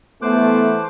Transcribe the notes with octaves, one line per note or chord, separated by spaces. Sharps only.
E3 A3 B3 C5 D6 F#6